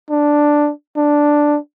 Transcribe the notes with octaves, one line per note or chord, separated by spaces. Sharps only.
D4
D4